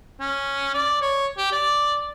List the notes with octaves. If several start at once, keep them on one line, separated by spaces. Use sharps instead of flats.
C#4
D5
C#5
G4
D5